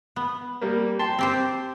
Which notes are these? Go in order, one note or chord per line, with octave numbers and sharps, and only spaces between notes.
B3
G3 A#3
G5 A5 C6
C4 G4 C5